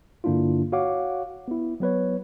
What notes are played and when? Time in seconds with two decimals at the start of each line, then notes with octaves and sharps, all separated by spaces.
0.24 G2 D3 A#3 D4 E4 F4
0.72 F#4 C#5 F5 F#5 D6
1.48 B3 E4
1.80 F#3 B3 B4 C#5